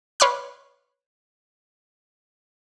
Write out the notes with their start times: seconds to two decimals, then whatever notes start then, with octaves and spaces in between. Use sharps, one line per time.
0.20 B4 C#5 C6 D6 F6 F#6